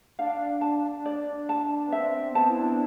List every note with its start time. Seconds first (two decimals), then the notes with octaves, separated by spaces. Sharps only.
0.19 D4 F5
0.61 A5
1.05 D5
1.49 A5
1.87 B3
1.92 C4 E5
2.31 B3
2.35 C4 A5
2.48 E4
2.57 D4